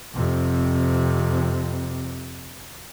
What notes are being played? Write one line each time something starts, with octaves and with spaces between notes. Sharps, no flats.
F2 C3